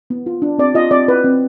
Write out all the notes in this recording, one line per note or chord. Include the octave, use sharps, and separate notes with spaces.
B3
F4
D4
C4 D5
F4 D#5
C4 D5
F4 B4
C4